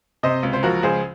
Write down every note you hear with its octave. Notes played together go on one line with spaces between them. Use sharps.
C3 C5 D#5
C#2
C5
F3 F#4 A#4
C#2 G#4 C5